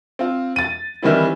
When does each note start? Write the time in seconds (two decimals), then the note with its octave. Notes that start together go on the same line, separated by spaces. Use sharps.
0.19 C4 F4
0.56 A6 D#7
1.02 D#3 E3 G3 C4 E4